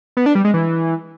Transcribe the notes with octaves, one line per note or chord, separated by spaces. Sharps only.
B3
D4
G3
G#3
E3